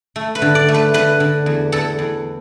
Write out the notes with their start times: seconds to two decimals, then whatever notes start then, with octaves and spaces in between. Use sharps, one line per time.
0.16 A3
0.35 B4
0.42 D3
0.55 D5
0.68 A3
0.74 B4
0.94 D3 B4
1.20 D3
1.46 E2
1.72 E2 A4
1.99 E2